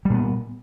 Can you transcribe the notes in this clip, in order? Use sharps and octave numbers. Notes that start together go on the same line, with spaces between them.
A#2 G3 B3